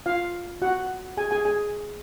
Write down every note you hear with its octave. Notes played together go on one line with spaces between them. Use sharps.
F4 F5
F#4 F#5
G#4 G#5
G#4 G#5
G#4 G#5